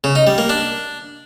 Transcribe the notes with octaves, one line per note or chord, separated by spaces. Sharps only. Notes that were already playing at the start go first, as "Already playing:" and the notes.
C#3
D#4
G3
A#3
D4